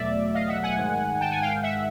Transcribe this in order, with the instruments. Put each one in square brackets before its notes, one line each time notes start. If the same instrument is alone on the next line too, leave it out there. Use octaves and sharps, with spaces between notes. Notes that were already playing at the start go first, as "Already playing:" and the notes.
Already playing: [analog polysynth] E2 B2 F#3 A3 D5 E5
D#5 F5
E5 F#5
F#5 G#5
G#2 D#3 G#3
G5 A5
F#5 G#5
F5 G5
E5 F#5